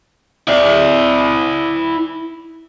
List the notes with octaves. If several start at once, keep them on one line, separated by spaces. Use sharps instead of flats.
E4 D5